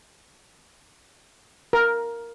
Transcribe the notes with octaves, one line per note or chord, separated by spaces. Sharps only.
A#4